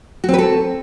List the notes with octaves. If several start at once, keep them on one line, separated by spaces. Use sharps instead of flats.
C4 F#4 A4 B4